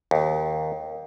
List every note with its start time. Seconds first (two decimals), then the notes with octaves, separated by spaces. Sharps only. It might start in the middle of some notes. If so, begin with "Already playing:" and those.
0.11 D#2